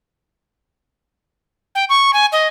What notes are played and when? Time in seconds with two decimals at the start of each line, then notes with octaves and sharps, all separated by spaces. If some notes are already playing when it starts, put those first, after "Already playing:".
1.75 G5
1.89 C#6
2.13 G#5
2.32 D#5